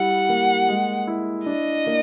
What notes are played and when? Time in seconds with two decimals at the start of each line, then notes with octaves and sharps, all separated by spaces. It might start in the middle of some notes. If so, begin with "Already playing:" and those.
Already playing: G3 E4 F#5
0.29 A#3
0.69 G#3
1.07 E4
1.46 D4 D#5
1.87 A#3